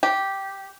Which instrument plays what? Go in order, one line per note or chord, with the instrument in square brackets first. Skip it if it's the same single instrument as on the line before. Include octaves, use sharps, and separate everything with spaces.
[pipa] G4